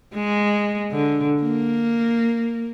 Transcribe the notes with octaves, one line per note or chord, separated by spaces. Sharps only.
G#3
D3
A#3